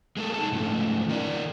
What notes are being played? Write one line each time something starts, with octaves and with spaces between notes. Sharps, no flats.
G#3 A#3 A4
D#4 A4 A5
G#2 C#3 F3 A3
D#3 D#4 A#4 D5